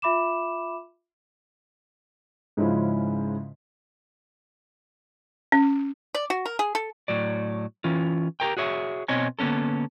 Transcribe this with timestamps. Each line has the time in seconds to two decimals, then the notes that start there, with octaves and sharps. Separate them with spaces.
0.02 F4 E5 B5 D6 E7
2.57 G#2 C#3 F3 G#3 C#4 E4
5.52 C#4
6.14 D5
6.30 F#4
6.46 A#4
6.59 G#4
6.75 A4
7.08 A2 F#3 D5
7.84 E3 C#4 F4
8.40 G4 G#4 A#4 G5
8.57 F#4 G#4 C#5 E5
9.08 B2 B3 C4 C#5 D#5 G#5
9.39 D3 A#3 B3 C#4 A4